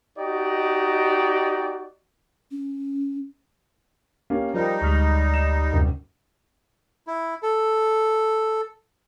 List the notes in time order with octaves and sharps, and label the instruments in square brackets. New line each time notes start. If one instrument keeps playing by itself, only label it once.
[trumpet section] D#4 F#4 G4 D5 D#5
[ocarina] C#4
[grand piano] A#3 C#4 G4
[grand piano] F3 A#4 G5 [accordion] G3 D#4
[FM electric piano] D2 G#3 [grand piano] C#6 F6 B6
[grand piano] E7
F#1 C2
[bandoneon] E4
A4